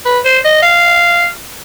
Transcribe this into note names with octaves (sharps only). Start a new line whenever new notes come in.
B4
C5
D#5
F5